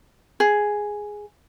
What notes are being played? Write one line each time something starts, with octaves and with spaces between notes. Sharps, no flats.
G#4